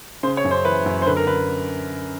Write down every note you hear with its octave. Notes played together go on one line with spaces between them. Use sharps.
C#3 C5
C#5
F#2
C5
E3 B4
F#2
C5
D3 B4
A#4
D3 B4